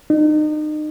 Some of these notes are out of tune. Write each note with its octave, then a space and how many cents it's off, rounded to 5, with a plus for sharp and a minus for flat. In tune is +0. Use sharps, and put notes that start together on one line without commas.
D#4 -35